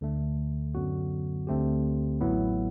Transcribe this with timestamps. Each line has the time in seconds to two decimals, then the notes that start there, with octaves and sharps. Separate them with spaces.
0.01 D2 D3 A3
0.75 F#2 D3 F#3 B3 F#4
1.47 D2 D3 A3 C4 G4
2.21 A1 A2 F#3 B3 E4